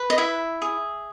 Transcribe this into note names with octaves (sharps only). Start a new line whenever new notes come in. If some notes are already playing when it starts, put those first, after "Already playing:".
Already playing: B4
D#5
E4 E5
G#4